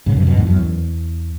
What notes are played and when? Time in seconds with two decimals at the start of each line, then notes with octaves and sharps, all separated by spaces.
0.06 G#2 C#3
0.17 F#2 B2
0.27 F#2 B2
0.37 E2 G#2
0.47 F#2
0.57 E2